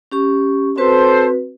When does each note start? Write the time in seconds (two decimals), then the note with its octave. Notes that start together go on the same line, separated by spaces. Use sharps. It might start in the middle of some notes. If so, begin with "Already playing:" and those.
0.12 C#4 G4 C#6
0.78 C4 F#4 A4 B4 C5